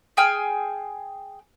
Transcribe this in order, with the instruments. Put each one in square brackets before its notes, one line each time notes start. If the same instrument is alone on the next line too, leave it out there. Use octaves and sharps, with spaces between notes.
[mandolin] G#4 G5 G#5 F6